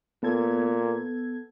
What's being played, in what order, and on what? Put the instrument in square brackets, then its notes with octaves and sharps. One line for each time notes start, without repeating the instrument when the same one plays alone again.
[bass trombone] A#2 [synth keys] B3 A4 G#6